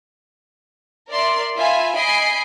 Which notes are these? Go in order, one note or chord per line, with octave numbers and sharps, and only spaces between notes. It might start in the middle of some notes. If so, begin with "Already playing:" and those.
A#4 D5 E5 C6
F4 E5 G#5 B5
D#5 G#5 B5 C7 D7